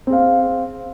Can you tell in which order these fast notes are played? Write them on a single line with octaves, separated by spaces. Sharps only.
C4 G#4 F5